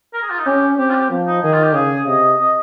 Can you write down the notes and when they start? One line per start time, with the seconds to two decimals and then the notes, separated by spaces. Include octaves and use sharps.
0.14 A#4
0.22 G#4
0.30 F4
0.39 D#4
0.46 C#4 G4
0.78 C4 G4
0.90 F4
0.95 G4
1.10 F3
1.27 D#4
1.43 D#3 G#4
1.53 F4
1.64 G4
1.74 C#3 G#4
2.07 C3 D#5
2.40 D#5